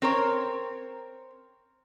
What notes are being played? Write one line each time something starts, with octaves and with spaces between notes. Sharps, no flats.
C4 A#4 C#5